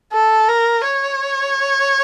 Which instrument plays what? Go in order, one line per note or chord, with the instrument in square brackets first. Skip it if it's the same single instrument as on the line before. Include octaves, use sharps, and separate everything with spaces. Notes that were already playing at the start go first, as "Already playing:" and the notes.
[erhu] A4
A#4
C#5